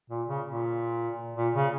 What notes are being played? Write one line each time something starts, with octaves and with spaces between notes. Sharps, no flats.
A#2
C#3
A#2
A#2
C#3